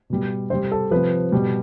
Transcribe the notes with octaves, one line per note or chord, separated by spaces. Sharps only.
B2 G3
C3 G3 C4 C5
A4
C3 F3 B4
B2 G3